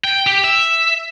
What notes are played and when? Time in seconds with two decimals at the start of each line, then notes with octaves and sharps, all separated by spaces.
0.04 G5
0.27 G4
0.44 E5